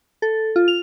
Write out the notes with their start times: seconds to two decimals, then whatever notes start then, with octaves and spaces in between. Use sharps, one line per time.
0.22 A4
0.56 F4
0.68 F7